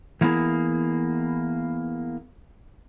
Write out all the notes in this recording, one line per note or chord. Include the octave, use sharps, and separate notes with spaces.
E3 A#3 B3 E4 G#4